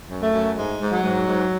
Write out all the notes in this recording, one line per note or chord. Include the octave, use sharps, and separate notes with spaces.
F#2
A3
F#2
G#2 G#3
G#2
F#3
G#2
G#2